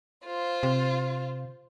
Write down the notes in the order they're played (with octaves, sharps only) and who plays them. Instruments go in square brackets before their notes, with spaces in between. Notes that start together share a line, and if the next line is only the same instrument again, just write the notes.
[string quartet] F4 C5
[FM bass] C3